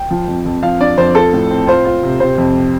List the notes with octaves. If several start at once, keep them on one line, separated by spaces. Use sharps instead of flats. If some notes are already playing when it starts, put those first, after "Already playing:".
Already playing: G5
F3
F2
F2
F3 F5
D4 D5
F2 C5
F4 A4
A2
C4
F4 C5
F4
C3
C3 C5
F2